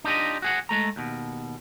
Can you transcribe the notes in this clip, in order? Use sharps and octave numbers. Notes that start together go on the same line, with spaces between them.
D4 D#4 F4 G4 D#5
F#4 G#4 F#5
G#3 A3 A#5
D#2 B2